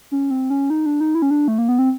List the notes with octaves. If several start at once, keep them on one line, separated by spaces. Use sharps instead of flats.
C#4
C4
C#4
D#4
D4
D#4
E4
C#4
D4
A3
A#3
B3
C4